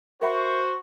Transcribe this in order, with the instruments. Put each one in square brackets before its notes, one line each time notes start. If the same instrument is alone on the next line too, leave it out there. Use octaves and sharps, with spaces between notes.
[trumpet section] F#4 C5 [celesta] A#4 E5 B5 [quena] C#6